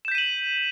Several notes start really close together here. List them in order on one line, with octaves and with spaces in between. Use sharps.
E7 G6 B6 D#7 F#7